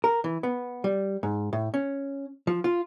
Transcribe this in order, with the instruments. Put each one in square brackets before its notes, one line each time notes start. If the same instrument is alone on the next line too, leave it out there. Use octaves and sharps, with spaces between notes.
[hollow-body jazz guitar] A#4
E3
B3
G3
G#2
A2
C#4
F3
F4